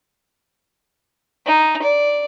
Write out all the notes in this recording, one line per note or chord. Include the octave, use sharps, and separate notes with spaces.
D#4
D5